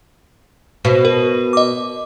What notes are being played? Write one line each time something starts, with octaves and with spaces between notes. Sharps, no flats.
B2
A#4
D#5 D6